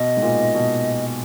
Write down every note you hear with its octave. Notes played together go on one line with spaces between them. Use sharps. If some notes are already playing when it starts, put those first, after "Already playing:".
Already playing: B2 D#5
G#2
A#2
B2